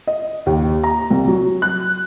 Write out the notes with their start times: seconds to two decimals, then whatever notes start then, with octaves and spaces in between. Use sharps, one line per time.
0.07 D#5
0.46 D#2
0.84 A#5
1.10 C2
1.28 F#3
1.62 F#6